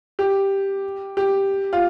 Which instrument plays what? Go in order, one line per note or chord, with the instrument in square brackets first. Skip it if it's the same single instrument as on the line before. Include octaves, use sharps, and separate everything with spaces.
[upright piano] G4
G4
F4